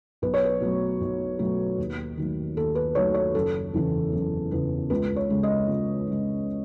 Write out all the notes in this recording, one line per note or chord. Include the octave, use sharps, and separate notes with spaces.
B1 B4
C#5
B4
B2 F#3 A3
B1
B2 F#3 A3
D#2
D#3 F#3 A3
D#2 A4
B4
D#3 F#3 A3 C#5
C#5
F#1 A4
E2 C#3 E3 B3
F#1
E2 C#3 E3 B3
C#2 B4
C#5
C#3 G#3
D#5
C#2
C#3 G#3